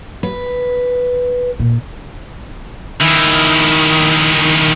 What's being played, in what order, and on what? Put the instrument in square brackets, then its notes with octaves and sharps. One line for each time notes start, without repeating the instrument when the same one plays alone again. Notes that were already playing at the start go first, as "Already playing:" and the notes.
[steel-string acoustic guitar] B4
[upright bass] A#2
[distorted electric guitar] D#3 E4